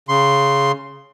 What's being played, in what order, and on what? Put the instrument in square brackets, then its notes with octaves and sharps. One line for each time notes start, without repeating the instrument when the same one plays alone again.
[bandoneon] C#3 C6